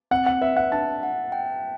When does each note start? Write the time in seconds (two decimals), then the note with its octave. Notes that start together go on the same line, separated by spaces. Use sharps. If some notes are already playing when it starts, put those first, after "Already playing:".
0.11 C4 F#5
0.26 F#5
0.41 B4 E5
0.57 F#5
0.72 D4 A5
1.03 F#5
1.32 G5